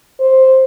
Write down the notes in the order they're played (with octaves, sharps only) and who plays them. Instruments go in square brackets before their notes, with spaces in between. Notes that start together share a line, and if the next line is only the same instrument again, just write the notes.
[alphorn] C5